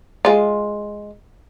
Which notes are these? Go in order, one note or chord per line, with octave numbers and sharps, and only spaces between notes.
G#3 F4